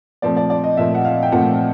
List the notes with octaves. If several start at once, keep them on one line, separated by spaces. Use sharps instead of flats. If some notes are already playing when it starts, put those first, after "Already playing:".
A#2 F3 A3 C4 D5
D5
D5
D#5
A#2 F3 A3 C4 E5
F#5
F5
G5
A#2 F3 A3 C4 F#5